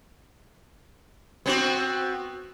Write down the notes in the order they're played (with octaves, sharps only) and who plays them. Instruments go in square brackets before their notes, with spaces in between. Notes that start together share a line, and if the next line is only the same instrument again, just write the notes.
[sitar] B3 C4 F#4